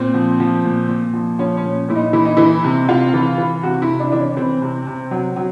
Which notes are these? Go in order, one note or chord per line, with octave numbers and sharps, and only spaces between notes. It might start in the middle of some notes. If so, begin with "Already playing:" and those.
Already playing: A#2 C4
F3
F3
A#2
A#2
F3
F3 C#4
C#4
A#2
A#2 E4
D#4
E3 E4
D#4
E3 E4
C3
C3 F4
E3
E3
C3 F#4
E4
C3
D4
E3 D4
C#4
E3 C4
C3
C3
F#3
F#3